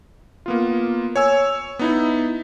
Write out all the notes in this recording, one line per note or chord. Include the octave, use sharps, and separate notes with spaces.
A#3 B3 F4
C#5 G#5 E6
B3 D#4 E4